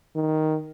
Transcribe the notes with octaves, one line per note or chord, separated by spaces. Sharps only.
D#3